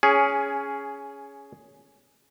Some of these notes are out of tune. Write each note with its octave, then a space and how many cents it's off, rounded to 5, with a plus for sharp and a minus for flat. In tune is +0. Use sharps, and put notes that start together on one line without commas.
C#4 +10 G#4 +0